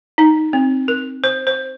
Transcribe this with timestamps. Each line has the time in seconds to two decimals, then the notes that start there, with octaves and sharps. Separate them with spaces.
0.18 D#4
0.53 C4
0.88 A#4
1.24 C5
1.47 C5